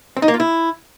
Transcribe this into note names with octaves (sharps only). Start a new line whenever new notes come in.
C4
D#4
A#3
F4
E4